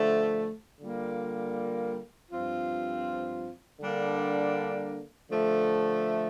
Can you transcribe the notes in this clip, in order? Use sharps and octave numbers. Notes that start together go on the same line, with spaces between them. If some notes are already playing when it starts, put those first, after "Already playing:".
Already playing: D3 F3 A3
D3 G3 A#3 F4
G2 F3 C4 F4
D3 G3 A#3 D4
D3 F3 A3